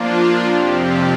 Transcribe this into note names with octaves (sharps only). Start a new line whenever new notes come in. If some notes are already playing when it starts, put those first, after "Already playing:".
Already playing: F3 A#3 D4 F4
F2 C3 F3 C4 G4